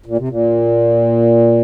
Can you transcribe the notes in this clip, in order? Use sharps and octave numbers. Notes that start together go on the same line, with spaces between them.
A#2
C3
A#2